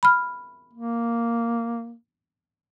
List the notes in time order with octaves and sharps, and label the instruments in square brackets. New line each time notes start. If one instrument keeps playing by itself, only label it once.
[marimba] B5 F6
[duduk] A#3